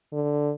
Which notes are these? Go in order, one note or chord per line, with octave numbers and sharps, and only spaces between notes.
D3